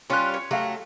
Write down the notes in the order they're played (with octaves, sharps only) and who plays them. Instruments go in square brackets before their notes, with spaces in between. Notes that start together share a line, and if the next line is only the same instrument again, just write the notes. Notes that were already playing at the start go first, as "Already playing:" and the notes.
[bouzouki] G3 C#4 F4 [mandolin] C6 F#6
[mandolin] C#5
[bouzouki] F#3 A3 [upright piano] G4 A4 F5